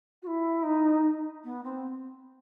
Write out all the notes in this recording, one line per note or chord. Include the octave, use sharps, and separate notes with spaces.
F#4
E4
D#4
B3
C4